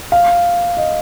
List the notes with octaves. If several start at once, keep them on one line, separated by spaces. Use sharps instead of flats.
F5
D#5